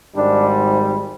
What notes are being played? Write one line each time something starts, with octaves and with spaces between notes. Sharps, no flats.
G#1 G#2 G3 D4